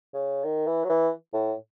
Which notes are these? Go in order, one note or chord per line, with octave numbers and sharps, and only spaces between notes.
C#3
D#3
E3
F#3
E3
A2